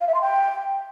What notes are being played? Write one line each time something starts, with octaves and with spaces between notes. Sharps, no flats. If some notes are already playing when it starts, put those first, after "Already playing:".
F5
E5
C6
G5